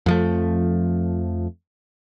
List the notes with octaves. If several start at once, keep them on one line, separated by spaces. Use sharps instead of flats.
F2 F3 A3